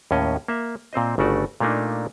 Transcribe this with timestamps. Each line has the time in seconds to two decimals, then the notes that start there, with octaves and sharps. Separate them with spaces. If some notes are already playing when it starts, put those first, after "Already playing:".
0.11 D#2 A2 C#4 D#5
0.48 A#3 E5
0.93 A#2 C4 C5 D#5
1.18 G1 C#3 A3 F#4 D5
1.60 A#2 A3 A#3 D4 D#4